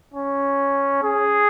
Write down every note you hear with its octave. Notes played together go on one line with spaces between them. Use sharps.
C#4
G#4